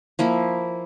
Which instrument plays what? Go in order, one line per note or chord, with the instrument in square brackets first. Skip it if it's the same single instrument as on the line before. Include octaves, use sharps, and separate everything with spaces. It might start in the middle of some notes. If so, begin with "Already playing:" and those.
[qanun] F3 A#3 E4